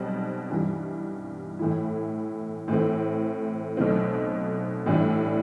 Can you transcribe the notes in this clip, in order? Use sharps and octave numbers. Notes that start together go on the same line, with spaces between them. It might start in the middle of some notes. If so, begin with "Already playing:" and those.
Already playing: B1 B2 G3 C4
G2 E3 G3
A2 E3 A3 E4
A2 E3 A3 C4
B1 B2 A3 C4
A2 E3 G3 D4